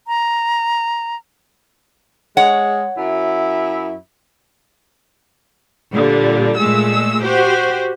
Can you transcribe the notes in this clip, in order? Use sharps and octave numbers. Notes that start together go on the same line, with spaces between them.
A#5
G#3 C#5 F#5
F#2 E4
A#2 D3 G3
A#2 G#3 A3 E6
F#4 G4 C5